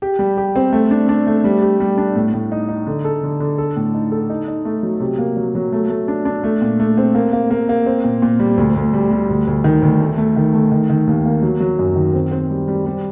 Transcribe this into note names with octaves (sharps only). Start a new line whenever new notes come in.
G4
G3
G4
C4
A3
D4
D4
A3
G3
G4
G3
D4
A2
A2
D#4
D#4
D3
A4
D3
D3
A4
A2
D#4
A4
D#4
D#4
A3
F#3
C3
A#3
F#3
F#3
A3
A3
D4
D4
A3
A#2
A3
C4
A#3
A#3
A#3
A#3
C4
A#2
A#2
G3
D2
D2
G3
G3
D2
D2
D#3
D2
A3
A3
D#3
A3
D#3
D#3
D#2
A#3
F#3
F#3
F#2
D#3
C4
C4
G3
G3
G3